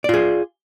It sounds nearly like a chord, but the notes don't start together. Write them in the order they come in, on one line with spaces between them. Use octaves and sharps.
D5 F4 G#4